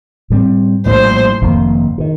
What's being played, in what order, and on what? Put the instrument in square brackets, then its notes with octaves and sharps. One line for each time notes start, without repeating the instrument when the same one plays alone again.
[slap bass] A2 G3 C4
[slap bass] A#1 A2 G3 [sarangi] C5
[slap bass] F1 F2 D#3 A#3
C3 D#3